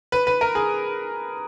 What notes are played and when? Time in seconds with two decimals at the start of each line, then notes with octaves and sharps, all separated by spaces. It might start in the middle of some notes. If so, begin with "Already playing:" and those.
0.12 B4
0.27 B4
0.41 A#4
0.55 G#4